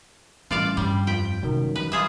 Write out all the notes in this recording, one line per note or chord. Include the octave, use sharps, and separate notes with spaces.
A2 E3 G3 C#4 F4 D5 F5
G2 G3
F2 F4 G5 B6
A1 F#2 C3 D#3 F#3
E3 F3 B4
G3 F4 G#4 E5